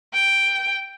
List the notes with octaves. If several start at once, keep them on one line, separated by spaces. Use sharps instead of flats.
G5